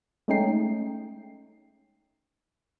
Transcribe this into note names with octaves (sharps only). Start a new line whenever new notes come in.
G#3 A3 C#4 D#4 G5 C7